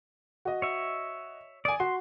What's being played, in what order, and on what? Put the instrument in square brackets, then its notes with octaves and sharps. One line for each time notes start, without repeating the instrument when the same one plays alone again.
[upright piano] F#4 D#5
[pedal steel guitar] C#5 E5
[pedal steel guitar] D5 [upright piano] G#5 D#6
[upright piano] F#4 [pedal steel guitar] C6